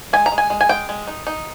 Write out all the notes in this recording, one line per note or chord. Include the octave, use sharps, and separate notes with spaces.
G#3 G#5
A#5
G#3
G#5
G#3
G#5
G#3 G5
G#3
D#4
D#4